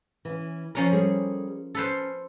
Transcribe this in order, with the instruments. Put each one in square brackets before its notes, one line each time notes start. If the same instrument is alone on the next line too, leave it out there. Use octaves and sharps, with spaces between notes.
[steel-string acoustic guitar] E3 C#4
[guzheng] F3 C#4 A#4 [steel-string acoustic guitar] A#5
[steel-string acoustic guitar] G3 G#4 A4
[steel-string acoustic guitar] C#4 [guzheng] A4 B4 C5